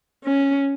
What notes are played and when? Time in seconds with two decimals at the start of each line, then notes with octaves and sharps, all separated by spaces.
0.24 C#4